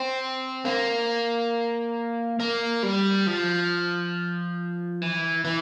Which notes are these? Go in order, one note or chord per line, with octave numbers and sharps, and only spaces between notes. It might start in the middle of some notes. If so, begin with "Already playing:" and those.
Already playing: C4
A#3
A#3
G3
F3
E3
E3